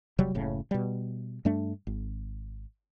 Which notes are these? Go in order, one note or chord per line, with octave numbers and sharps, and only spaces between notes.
E1 C3 F#3 G3
F#1 A2 C#3
B2 G3
G2 G3 A3 D4
G#1